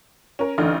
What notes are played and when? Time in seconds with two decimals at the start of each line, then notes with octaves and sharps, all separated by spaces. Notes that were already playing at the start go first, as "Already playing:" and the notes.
0.39 C#4 A#4
0.58 A1 D3 D#4 F6